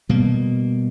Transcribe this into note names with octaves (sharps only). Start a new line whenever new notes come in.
B2 G3 A#3